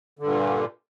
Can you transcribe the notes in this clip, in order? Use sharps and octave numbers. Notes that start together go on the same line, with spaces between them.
G2 A#2 D3